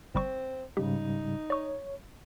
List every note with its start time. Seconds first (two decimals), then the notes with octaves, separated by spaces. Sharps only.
0.15 G1 G3 C4 C#6
0.77 G#2 C#3 G3 D#4 G4
1.50 C#5 D5 C#6